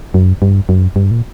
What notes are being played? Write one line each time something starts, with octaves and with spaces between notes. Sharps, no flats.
F#2
G2
F#2
G2
A#2